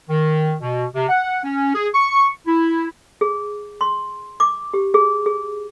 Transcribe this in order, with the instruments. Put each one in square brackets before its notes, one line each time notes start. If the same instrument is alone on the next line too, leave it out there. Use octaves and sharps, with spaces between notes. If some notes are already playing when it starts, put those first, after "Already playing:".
[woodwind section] D#3
B2
C3
F#5
C#4
G#4
C#6
E4
[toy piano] G#4
C6
D6
G4
G#4
G#4